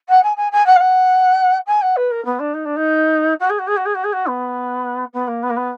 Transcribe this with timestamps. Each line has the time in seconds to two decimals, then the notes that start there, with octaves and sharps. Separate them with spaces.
0.09 F#5
0.23 G#5
0.37 G#5
0.52 G#5
0.66 F#5
0.76 F5
0.80 F#5
1.66 G#5
1.82 F#5
1.96 B4
2.11 A#4
2.25 B3
2.39 D4
2.54 D#4
2.65 D4
2.76 D#4
3.40 F#4
3.50 G#4
3.59 F#4
3.67 G#4
3.77 F#4
3.85 G#4
3.94 F#4
4.04 G#4
4.13 F#4
4.27 B3
5.13 B3
5.27 A#3
5.43 B3
5.50 A#3
5.56 B3